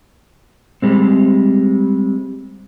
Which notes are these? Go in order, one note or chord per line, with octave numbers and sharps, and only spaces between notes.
G3 G#3 C4